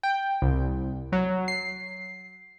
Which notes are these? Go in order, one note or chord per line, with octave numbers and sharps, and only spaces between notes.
G5
C2
F#3
C7